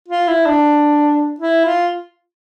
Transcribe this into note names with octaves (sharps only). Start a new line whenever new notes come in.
F4
E4
D4
E4
F4